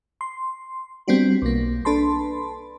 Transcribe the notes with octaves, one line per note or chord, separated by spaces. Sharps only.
C6
G3 B3 C4 D4 F#4
B1 A#3
D4 A4 B4 A5 B5 C6